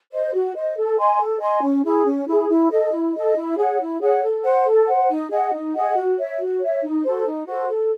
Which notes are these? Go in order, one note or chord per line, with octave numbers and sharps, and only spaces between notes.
C5 D#5
F#4
C5 D#5
A4
D#5 G#5 C6
A4
D#5 G#5 C6
C#4
E4 G#4
C#4
E4 G#4
E4
A4 D#5
E4
A4 D#5
E4
G#4 C#5 F#5
E4
G#4 C#5 F#5
A4
C5 F#5
A4
C5 F#5
D#4
G#4 D#5 F#5
D#4
G#4 D#5 F#5
F#4
C#5 E5
F#4
C#5 E5
D#4
F#4 A4 C5
D#4
F#4 A4 C5
A4